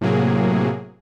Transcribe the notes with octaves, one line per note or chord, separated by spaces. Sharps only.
A2 C3 F#3 A#3 G#4